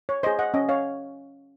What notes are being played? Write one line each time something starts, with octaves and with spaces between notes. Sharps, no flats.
C#5
G#4 C5 D#5
D#5 F#5
C#4 D#5
C#5 F5